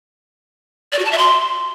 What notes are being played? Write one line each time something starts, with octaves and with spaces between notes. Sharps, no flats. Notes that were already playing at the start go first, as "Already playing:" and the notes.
D5
F#4
A5
E5
C6